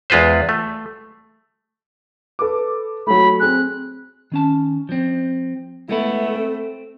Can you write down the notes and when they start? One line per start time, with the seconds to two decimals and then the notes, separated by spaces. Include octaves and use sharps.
0.10 E2 G#3 F4 B4 C5
0.49 A3
2.39 A4 B4 D6
3.07 F#3 A3 B5
3.40 C4 G#4 F#6
4.32 D#3 C#4 A5
4.89 F3 C4
5.89 G#3 A3 B3 E4
6.35 C4